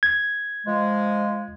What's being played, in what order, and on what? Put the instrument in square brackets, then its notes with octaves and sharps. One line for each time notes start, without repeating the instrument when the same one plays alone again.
[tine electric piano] G#6
[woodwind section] F3 G#3